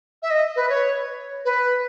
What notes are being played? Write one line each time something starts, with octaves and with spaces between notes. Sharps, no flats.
E5
D#5
B4
C#5
B4